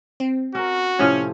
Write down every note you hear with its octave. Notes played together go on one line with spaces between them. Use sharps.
C4
C#4 F#4 A#4
A2 C3 F3 C#4